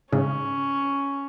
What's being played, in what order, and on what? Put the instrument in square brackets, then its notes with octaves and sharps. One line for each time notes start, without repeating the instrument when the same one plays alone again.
[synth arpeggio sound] G#2 C#3 [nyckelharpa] C#4